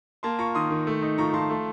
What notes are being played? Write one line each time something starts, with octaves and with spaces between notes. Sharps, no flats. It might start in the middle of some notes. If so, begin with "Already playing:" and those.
A#3 A5 C6
F4 A#5 C#6
D#3 C6 D#6
D#3
A3
D#4
F3 A#5 C#6
F3 A5 C6
A3